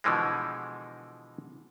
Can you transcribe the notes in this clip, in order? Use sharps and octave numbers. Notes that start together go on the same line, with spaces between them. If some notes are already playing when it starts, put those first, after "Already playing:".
B2 D3 E3 F3 G#3